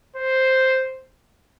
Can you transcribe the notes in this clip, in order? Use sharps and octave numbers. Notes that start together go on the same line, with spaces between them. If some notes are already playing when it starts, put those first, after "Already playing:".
C5